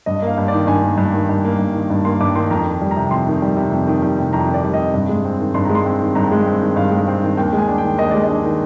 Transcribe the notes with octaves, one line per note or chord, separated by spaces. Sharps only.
G2 D#5
A#3 F5
G2
D5
D#3
G2 G#5
A#3
G2
D#3
G2
A#3
G2
D#3
G2
A#3 C6
G2 D6
D#3 C6
F2 A#5
D#3
G3
A#5
C3
F2 C6
D#3
G3
C3
F2
D#3
G3
C3
F2 A#5
D#3
D5
G3
D#5
C3
G2
G#3
C4
D#3
G2 C6
G#3 A#5
C6
C4
D#3
G2 A#5
G#3
C4
D#3
G2 F5
G#3
C4
D#3
D#2 G5
G#3
G#5
D4
D#3 G5
D#2 D#5
G#3 D5
D#5
D4
D#3